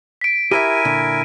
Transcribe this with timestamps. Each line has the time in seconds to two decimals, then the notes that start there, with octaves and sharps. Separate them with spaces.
0.21 B6 D7
0.51 E4 G4 A#4 D#5 E5 G#5 D#7
0.85 A#2 D3